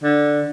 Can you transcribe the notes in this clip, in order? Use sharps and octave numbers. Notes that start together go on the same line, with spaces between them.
D3